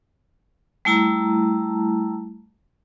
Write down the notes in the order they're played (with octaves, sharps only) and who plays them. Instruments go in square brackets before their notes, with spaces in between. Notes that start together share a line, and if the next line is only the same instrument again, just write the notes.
[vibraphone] G3 A3 E4 A5 A#5